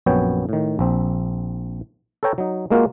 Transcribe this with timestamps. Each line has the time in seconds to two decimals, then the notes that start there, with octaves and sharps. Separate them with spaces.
0.06 A#1 F#2 B3 C#5 G5
0.49 A2 D#3
0.79 A#1 C4
2.23 A4 B4 C#5 G5 A#5
2.38 F#3 D#4
2.70 G#3 A#3 F4 F#4 A#4